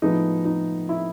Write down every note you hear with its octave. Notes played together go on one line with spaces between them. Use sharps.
A2 F3 G#3 B3 D#4
D#4
E4